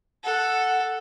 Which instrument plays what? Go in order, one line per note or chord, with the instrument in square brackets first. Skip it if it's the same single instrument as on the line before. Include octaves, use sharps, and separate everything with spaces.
[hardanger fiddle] A4 [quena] F#5